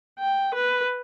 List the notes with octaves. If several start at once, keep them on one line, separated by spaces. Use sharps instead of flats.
G5
B4